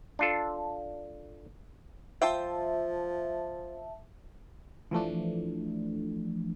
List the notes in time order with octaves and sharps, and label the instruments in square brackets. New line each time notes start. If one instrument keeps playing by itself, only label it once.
[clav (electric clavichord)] D4 F4 A4
[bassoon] F3 [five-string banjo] F4 C5 G5 [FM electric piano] E5 A5
[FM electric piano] E3 F3 A3 D4